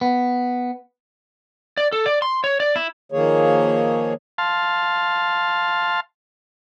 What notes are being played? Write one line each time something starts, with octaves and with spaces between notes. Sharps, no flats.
B3
D5
A4
D5
C6
C#5
D5
E4
D#3 F3 A#3 G#4 C#5
F5 A5 C6